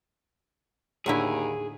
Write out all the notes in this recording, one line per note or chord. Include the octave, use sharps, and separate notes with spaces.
D#2 A2 D3 E4 G#4